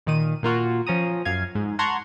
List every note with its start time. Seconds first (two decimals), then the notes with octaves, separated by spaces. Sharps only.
0.07 A#2 D#3 D#7
0.43 A#2 A#3 F4 F#4
0.87 F3 C#4 A#5 D#6
1.25 F#2 F5 G#6
1.55 G#2
1.79 F#5 A5 A#5 C6 C#6 G#6